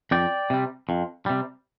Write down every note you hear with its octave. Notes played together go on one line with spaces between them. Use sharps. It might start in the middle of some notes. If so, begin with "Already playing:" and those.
F2 D5 G5
C3 G3
F2
C3 G3